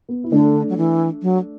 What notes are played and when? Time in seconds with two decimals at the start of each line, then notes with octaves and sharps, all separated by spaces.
0.09 B3
0.24 E4
0.31 D3 A3 D4
0.69 F#3
0.77 E3
1.22 F#3